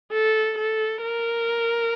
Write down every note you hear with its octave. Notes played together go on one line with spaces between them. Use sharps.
A4
A4
A#4